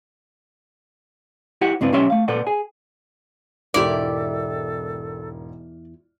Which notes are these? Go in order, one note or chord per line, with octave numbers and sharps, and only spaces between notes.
E4 G4 C5 F#5
C#2 G2 C4 D4 E4 B4
B1 C#4 G4 E5 C6
A3 F5
A#2 A4 B4 C5 D5 F#5
G#4 G#5
E1 E2 G#2 E4 G4 A4 A#4 D5